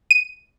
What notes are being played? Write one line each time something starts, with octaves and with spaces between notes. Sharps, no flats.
D#7